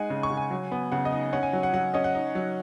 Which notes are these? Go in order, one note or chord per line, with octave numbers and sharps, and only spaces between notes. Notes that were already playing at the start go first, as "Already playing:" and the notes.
Already playing: G#3 D#4 F#5 G#5
C#3
C#6
C#3
G#5
F#3
B3
C#3 F#5
D#5
D#4
C#4 F#5
G#5
F#3
F#5
F#3 F#5
C#4 D#5
F#5
D#4
F#3